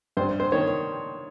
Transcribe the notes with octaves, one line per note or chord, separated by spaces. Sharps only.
G2 C5
C5
D#3 C#5